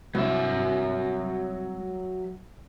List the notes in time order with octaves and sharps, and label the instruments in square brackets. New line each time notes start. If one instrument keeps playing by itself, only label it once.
[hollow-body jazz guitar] C2 [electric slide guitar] F#3 E5